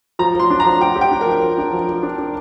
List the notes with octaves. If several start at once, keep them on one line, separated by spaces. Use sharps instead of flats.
F3 A#5
F3 C6
D4
A#5
F3
F3 G5
G4
G5
D4
A#4
F3
F3
D4
F3
F3
D4
D4